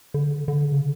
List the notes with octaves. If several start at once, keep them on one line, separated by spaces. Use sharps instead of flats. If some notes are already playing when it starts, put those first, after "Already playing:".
D3
D3
C#3